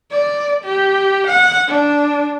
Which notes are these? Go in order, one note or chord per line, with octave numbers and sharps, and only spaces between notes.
D5
G4
F#5
D4